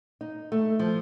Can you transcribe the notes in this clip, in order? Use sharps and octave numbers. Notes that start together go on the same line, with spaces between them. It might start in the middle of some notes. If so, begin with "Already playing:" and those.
D#4
A3
F3